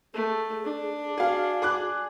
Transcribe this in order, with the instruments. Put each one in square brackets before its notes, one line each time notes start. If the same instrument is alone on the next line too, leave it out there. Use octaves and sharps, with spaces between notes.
[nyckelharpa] A3 [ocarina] G#4
[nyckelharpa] D4
[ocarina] F#4 [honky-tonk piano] G#4 F5
[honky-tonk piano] G#4 D6 F#6